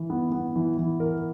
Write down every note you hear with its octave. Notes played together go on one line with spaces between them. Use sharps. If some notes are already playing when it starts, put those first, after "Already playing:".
Already playing: E3
B3
B3
E3
E3
A#4